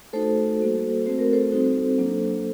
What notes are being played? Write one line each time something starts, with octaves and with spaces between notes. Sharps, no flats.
A3 D#4 F#4 A4 C5
G3 A#3 F#4
A3 C4 F#4 C5
A#4
A4 C5
G3 C4 D#4 F#4
F#3 A#3 D4